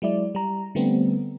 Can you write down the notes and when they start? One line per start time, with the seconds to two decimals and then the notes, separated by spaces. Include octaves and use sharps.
0.02 F#3 G#3 E4 D5
0.35 G3 A#5
0.75 D3 G3 A3 B3 C4